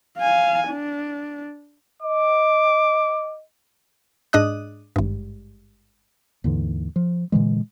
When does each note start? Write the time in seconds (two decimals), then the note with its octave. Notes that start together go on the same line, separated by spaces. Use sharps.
0.19 F5 G#5
0.69 D4
2.02 D#5 D6
4.33 G#2 D4 D#5 D#6 F#6
4.96 G#1 G2
6.44 D#2 G#2 D3 E3
6.96 F3
7.32 A#2 D3 E3 G#3